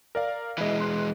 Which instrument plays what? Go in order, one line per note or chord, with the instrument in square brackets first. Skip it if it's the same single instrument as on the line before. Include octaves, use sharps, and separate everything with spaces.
[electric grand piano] A#4 D5 F5
[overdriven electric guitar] E3 G#3 [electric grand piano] E4 D#5
[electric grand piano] C6 F#6